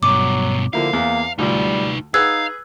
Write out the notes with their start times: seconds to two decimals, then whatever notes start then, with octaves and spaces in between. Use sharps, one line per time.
0.03 G2 B2 F#3 C#6 D6
0.73 D3 F3 A#3 E4 F5
0.93 E2 A#3
1.39 D2 D3 G3 D#4 F4 B4
2.14 D#4 G#4 B4 F5 F#5 E6 F#6 G#6